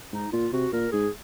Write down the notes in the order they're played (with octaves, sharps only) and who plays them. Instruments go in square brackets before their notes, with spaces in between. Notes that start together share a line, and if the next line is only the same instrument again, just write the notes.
[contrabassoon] G#2 [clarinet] D#4
[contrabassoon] A#2 [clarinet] F4
[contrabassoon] C3 [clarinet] F#4
[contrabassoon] A#2 [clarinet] A#4
[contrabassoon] G#2 [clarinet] G#4